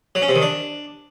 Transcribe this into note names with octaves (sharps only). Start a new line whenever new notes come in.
F#3
C#4
C3
D#3
D4